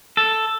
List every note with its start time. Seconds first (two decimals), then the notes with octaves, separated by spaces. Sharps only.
0.17 A4